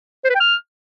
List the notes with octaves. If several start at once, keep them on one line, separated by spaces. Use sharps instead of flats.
C5
B4
G5
F6